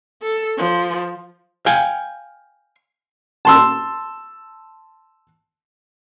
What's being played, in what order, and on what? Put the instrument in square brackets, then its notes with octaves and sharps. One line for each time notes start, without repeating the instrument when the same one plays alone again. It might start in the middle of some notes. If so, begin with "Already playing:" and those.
[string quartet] A4
F3
[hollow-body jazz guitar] F5 G5 G#5
[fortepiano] A5 C6 E6